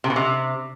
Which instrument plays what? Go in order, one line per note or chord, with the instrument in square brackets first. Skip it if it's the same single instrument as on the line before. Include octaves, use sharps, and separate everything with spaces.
[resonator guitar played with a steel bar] C3
B2
C3